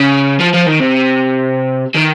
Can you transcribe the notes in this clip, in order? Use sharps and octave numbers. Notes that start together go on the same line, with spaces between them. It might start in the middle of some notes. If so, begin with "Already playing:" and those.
Already playing: C#3
F3
F3
D#3
C3
D#3